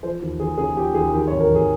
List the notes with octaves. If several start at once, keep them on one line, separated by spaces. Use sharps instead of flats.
F3 C5
D#2
D#2 G#4
C#3 G#4
F3 G4
D#2 G#4
D#3 G4
C#5
G#1
A#4
G#1
G#4